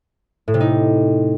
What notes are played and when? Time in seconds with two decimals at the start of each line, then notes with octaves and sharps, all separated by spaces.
0.48 A2
0.54 C3
0.60 D#4